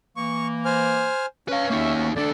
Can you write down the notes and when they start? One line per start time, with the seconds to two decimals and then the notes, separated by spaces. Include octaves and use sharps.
0.16 E3 A#3 C#6
0.65 C5 G#5 F6
1.48 C#4 B4 F5
1.70 E2 A#3 D#4 F#4 E5
1.96 D2 B3 F#4
2.16 D#2 D4 A4 D5